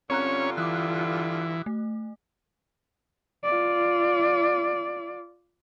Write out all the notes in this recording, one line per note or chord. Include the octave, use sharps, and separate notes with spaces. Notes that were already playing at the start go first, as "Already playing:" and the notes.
G2 D3 C4 C#4 F4 C#5 A#5 F#6
E3 D6 D#6 F#6
A3
F4 D5